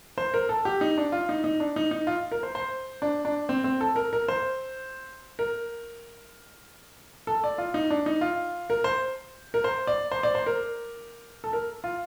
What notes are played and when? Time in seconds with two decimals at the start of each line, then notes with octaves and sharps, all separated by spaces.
0.18 C5
0.34 A#4
0.49 A4
0.65 G4
0.81 D#4
0.98 D4
1.12 F4
1.29 D#4
1.44 D#4
1.60 D4
1.76 D#4
1.91 D#4
2.07 F4
2.32 A#4
2.43 C5
2.55 C5
3.02 D4
3.25 D4
3.49 C4
3.64 C4
3.81 A4
3.96 A#4
4.13 A#4
4.28 C5
5.39 A#4
7.27 A4
7.44 D5
7.58 F4
7.74 D#4
7.90 D4
8.06 D#4
8.21 F4
8.70 A#4
8.84 C5
9.54 A#4
9.64 C5
9.87 D5
10.12 C5
10.23 D5
10.35 C5
10.46 A#4
11.44 A4
11.53 A#4
11.84 F4